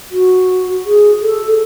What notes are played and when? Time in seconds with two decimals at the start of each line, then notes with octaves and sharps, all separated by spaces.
0.11 F#4
0.86 G#4
1.22 A4